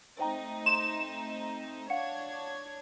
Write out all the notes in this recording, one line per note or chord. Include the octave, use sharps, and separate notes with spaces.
A3 C4 D#4 C5 G5 A#5
C6 E7
D4 C#5 F5 F#5 G#6 C#7